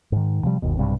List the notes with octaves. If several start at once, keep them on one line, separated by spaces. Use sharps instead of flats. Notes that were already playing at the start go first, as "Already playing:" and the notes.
G#2 D#3
C3 F3 G3
G1 D#2 B2
B1 G2 C3